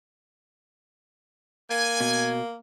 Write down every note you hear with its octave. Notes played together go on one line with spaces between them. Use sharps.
A#3 G#5
B2